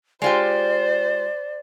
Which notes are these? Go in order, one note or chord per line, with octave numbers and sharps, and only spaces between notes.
G#3 F4 G4 C5 D5